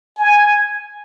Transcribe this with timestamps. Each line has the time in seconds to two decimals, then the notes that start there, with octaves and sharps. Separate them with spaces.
0.18 G#5